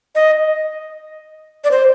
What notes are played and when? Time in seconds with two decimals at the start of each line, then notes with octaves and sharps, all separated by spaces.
0.15 D#5
1.64 D5
1.71 C5